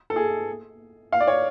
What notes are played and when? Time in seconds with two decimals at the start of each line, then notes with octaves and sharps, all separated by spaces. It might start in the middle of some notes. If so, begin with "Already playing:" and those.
0.10 A4
0.16 G#4
1.12 F5
1.20 D5
1.28 C#5